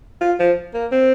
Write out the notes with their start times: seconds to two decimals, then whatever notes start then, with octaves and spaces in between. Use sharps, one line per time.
0.21 F4
0.39 F3
0.74 A#3
0.92 C4